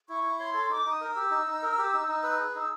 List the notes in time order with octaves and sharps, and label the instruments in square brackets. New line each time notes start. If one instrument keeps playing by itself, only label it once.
[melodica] E4 [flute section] C#6
[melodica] E4
[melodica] C#5 [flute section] C6
[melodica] A4
[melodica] D#4 [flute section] D6
[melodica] D#4 [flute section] D#6
[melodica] A#4
[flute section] E6
[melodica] G4
D#4
D#4
A#4
G4
D#4
D#4
B4
G#4
[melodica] D#4 [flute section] E6